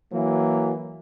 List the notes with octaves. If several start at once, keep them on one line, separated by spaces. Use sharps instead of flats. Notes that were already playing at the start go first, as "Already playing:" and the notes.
E3 F#3 A#3